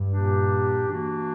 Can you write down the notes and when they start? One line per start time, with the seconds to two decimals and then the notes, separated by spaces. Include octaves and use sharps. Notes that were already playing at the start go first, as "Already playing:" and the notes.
Already playing: G2
0.09 A#2 A#3 D4 G4
0.88 E3 A#3 D4 F#4